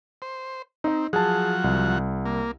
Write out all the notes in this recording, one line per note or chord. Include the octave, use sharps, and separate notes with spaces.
C5
C4 D#4 D#5
F3 F#3 G#4 F#5 A5
C2
A#3